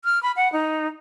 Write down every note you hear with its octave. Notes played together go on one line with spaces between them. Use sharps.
F6
B5
F#5
D#4